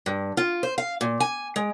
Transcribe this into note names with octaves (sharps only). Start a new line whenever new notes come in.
G2
F4
C5
F5
A#2
G#5
G#3